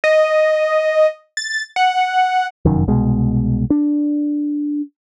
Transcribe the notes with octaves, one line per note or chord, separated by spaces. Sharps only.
D#5
A6
F#5
F1 F#2 D#3
C2 B2 G#3
D4